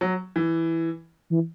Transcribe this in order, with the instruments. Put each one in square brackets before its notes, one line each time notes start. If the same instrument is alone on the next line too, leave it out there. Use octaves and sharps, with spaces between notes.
[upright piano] F#3
E3
[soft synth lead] E3